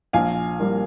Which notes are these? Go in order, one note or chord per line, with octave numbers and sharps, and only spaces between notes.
A#1 F5 G#5
G3 A#3